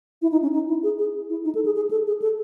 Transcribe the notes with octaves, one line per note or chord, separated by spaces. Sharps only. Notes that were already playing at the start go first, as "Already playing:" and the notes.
E4
D#4
C#4
D#4
E4
G#4
G#4
E4
D#4
A4
G#4
G#4
A4
G#4
A4